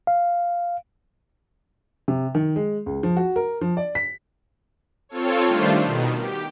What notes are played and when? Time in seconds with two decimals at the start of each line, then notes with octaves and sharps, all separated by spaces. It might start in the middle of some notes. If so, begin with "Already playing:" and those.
0.07 F5
2.08 C3
2.35 D#3
2.56 G#3
2.86 C#2
3.03 F3
3.17 F#4
3.36 A#4
3.61 F3
3.77 D5
3.95 B6
5.09 C4 F4 A4 C#5
5.46 D#3 G3 A3 D4 F4 C5
5.83 B2 D#3
6.17 G4